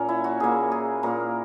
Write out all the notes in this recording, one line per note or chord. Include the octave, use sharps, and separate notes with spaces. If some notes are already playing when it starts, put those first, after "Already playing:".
Already playing: A#2 A#3 C#4 A#4
E4
F#4
A#2 A#3 G#4
G#4
A#2 A#3 A#4